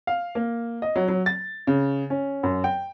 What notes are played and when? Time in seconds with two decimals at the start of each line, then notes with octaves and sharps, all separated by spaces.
0.07 F5
0.35 A#3
0.82 D#5
0.96 F#3
1.08 F#3
1.26 A6
1.67 C#3
2.10 C#4
2.43 F#2
2.64 G5